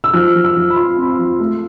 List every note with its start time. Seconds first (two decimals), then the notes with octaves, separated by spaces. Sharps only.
0.04 E6
0.13 F3 F6
0.35 F3
0.44 E6
0.56 F3
0.70 B5
0.76 F4 C6
0.97 C4
1.02 B5
1.08 C6
1.18 F3
1.40 A3